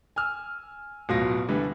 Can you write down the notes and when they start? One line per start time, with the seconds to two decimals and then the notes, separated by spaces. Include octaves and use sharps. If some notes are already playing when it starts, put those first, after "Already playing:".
0.16 G#5 E6 F6
1.09 D1 B2 F#3 F4 F5 A#6
1.48 D3 E3 G3 A3